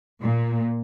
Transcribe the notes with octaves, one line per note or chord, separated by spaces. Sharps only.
A#2